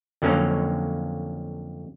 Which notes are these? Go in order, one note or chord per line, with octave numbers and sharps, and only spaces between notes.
F2 D3 F#3 A#3 C#4